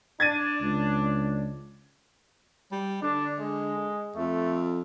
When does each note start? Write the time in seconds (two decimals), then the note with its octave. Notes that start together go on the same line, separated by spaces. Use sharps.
0.20 D4 G#6 A6 D#7
0.61 C#2
2.72 G3
3.02 D3 D4
3.40 G#3
4.16 F2 A3